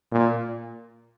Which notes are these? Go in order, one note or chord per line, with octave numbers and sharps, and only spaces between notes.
A#2